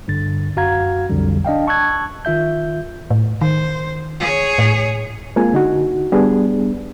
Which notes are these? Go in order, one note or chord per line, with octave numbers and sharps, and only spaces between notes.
G2 D3 A6
F#2 F#4 F5 A#5 G#6
B1 F2 D3 G3
D4 D#5 F5 G5
A5 C#6 E6 F#6 G#6
D#3 F4 E5 G6
A2
D#3 C5
G#4 C#5
A2
G#3 A#3 C4 F4 G#5
D3 D#4 F#4
G3 B3 D4 G#4